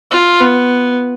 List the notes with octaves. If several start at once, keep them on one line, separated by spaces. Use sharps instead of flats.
F4
B3